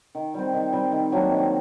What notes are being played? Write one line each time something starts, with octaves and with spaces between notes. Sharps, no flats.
D#3
G3 C4
D#3
G3 C4
D#3
F#3 A#3 D4
D#3